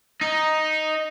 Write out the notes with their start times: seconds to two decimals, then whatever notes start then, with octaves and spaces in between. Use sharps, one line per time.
0.21 D#4